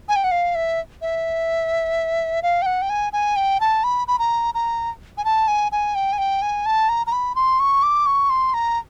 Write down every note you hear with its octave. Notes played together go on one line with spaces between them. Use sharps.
G#5
G5
F#5
F5
E5
E5
F5
G5
F#5
G5
G#5
G#5
G5
A5
B5
B5
A#5
A#5
G#5
A5
G#5
G#5
G5
G#5
G5
G#5
A5
A#5
A#5
B5
C6
C#6
D6
C#6
C6
A#5